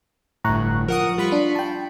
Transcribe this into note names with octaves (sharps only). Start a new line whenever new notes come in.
G1 A2 A#5 C#6 F#6
F3 A#4 F#5 D#6
G3 F4 B5 C#6
D4
G5 A5